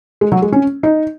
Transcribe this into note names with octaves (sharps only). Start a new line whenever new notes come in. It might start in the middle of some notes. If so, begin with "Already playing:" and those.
G#3
F#3
G#3
C#4
D#4